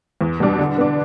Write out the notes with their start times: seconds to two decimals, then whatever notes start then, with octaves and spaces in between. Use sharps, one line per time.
0.21 E2
0.40 B2 G3 D4
0.59 D3
0.78 B3 D4